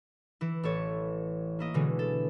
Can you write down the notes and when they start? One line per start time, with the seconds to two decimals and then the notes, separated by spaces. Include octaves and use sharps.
0.41 E3 E4
0.63 A1 A4 C#5
1.59 A#3 E4 D#5
1.74 B2 D3 E3 G#3
1.99 A4